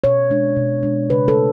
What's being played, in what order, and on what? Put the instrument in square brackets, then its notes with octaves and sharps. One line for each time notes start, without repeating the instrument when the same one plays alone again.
[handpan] B2 C#5
G#3 D4
B2
G#3 D4
C#3 B4
A4
G#3